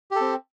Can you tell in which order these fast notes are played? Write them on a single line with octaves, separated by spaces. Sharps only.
G4 A4 C4